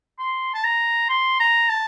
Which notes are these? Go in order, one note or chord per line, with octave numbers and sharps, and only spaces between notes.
C6
A5
A#5
C6
A#5
A5